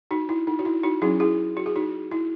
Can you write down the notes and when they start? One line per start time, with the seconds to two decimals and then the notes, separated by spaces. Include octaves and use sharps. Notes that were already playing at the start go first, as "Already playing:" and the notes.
0.11 D#4 F#4
0.29 E4
0.47 D#4
0.59 F#4
0.65 E4
0.83 D#4 F#4
1.02 F#3 C#4 E4 G#4
1.20 E4 G#4
1.57 F#4
1.66 G#4
1.76 D#4 F#4
2.11 E4